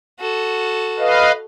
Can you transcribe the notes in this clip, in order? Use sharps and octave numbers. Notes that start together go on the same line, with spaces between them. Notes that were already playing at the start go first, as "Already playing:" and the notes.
F#4 A4
B4 D#5 F5